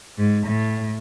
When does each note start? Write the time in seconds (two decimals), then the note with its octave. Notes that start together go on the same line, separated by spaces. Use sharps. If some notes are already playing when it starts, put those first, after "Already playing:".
0.18 G#2
0.47 A2